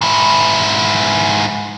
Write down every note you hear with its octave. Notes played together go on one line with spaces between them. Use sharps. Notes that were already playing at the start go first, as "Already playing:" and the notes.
G#2 E4